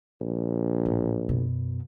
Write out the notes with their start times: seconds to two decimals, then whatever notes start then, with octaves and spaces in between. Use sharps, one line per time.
0.21 A#1
0.86 A1
1.28 F#2 B2